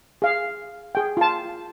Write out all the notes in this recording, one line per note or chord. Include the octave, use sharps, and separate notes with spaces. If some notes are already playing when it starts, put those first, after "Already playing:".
G#4 F5
G#4 G5
F4 A5